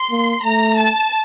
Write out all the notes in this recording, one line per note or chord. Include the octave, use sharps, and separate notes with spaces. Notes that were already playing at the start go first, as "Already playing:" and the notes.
Already playing: C6
A#3
A3 A#5
A5